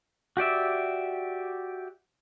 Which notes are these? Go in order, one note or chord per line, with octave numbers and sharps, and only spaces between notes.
F#4 G4 D5 E5